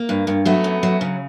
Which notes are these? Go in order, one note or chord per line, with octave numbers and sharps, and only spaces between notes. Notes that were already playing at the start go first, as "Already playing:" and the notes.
Already playing: A#3
G2
G2
F#3 A3 B3
F#2
F#3
C#3